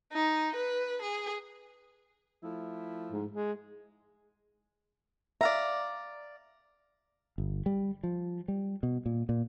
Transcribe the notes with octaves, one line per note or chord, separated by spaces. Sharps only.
D#4
B4
G#4
F3 A3 E4
G#2
G#3
D5 E5 F5 A#5
G1
G3
F3
G3
B2
A#2
A#2